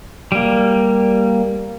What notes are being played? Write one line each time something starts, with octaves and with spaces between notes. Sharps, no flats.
G3 A#3